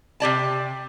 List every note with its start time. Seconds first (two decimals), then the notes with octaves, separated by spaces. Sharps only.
0.20 C3 G4 D5 A5